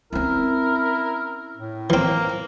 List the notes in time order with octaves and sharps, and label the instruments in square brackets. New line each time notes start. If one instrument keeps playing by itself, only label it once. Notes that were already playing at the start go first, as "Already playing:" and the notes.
[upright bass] C4 C#4 [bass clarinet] E4 [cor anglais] A#4
[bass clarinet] A2
[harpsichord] E3 C4 [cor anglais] A#3